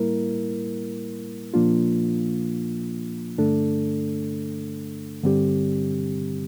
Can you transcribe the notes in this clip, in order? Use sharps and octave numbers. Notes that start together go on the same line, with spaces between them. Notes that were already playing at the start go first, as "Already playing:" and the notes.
Already playing: A2 G3 A#3 E4 A#4
A#2 F3 A#3 D4 F4
G2 D3 A3 D4 A4
G2 D3 G3 C4 G4